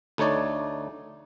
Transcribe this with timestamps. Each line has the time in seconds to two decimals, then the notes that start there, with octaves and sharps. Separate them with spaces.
0.18 D2 A3 D#4 C#5 D5